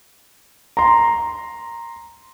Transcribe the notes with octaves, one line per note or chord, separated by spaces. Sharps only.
A#5 C6